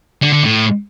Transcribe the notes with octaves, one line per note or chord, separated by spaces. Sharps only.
D3
D3
A2